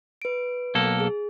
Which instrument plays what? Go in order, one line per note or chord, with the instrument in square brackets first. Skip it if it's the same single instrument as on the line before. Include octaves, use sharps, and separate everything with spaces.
[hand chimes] B4 D7
[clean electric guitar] B1 A#3 A4
[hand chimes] G#4